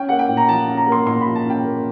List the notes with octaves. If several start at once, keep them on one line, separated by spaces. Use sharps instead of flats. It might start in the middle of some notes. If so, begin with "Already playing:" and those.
Already playing: C#4 G5
A#3 F#5
G5
A#2
A#5
F3 A5
C#4 A5
A#5
A#3
C6
A#2 C6
F3 B5
A5
C#4 G5
A#3